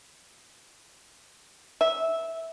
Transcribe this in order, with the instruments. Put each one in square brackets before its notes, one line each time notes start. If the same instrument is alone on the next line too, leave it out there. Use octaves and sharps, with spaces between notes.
[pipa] E5